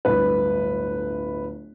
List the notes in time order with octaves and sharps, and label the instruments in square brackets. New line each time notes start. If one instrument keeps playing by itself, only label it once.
[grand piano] D1 G1 B4